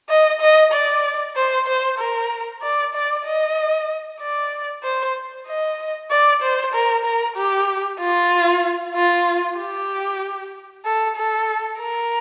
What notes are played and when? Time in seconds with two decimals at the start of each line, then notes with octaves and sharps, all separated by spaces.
0.10 D#5
0.41 D#5
0.72 D5
1.36 C5
1.67 C5
1.99 A#4
2.63 D5
2.94 D5
3.26 D#5
4.21 D5
4.83 C5
5.47 D#5
6.11 D5
6.42 C5
6.74 A#4
7.05 A#4
7.37 G4
8.00 F4
8.96 F4
9.58 G4
10.85 A4
11.17 A4
11.80 A#4